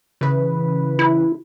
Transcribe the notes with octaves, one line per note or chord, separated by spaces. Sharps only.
C#3 E3 B4
E4